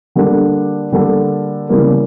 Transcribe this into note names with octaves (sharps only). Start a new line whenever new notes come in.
D3 G3 A#3 D4 A4
D3 G3 A#3 D4 A4
C#3 E3 G3 A#3